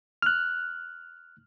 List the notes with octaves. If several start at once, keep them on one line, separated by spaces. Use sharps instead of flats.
F6 F#6